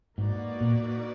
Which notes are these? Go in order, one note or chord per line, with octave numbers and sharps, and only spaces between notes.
G#2 A#3 D#4 F#4 B4 D5
A#2